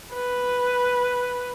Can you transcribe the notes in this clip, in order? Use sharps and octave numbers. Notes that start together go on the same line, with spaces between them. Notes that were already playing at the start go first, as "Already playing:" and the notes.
B4